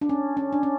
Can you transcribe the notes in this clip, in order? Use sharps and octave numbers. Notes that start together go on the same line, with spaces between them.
D4
C#4
C#4
D4
C#4